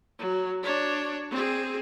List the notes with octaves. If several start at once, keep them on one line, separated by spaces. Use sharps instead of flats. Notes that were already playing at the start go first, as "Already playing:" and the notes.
F#3
D4 C#5
C4 G#4